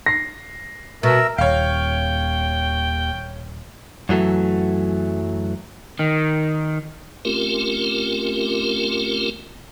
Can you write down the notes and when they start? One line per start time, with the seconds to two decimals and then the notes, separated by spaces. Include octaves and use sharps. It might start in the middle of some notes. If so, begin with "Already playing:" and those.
0.06 A#6 C7
1.03 B2 A#4 E5
1.38 D#1 D#2 C#5 F5 G5
4.09 F#2 E3 F#3 A3
5.99 D#3
7.25 A3 C4 C#4 F4 G4 A#4